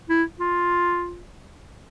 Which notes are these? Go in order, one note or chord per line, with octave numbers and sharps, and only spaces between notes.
E4
F4